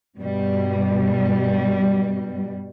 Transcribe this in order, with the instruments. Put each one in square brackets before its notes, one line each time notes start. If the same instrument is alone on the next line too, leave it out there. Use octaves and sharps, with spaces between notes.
[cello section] G2 B2 G3